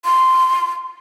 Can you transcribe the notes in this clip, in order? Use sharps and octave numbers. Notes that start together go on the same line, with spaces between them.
C6